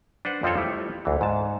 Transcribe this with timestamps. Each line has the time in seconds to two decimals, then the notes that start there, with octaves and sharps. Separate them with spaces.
0.25 D4 B4 C5 F#5
0.43 F2 F3 C4 F4 A4 C#5
0.57 G3 A3 E4
1.05 D2 E3
1.21 G#2 A5